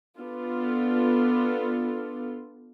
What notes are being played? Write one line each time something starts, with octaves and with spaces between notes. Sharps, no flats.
B3 D4 F4 A4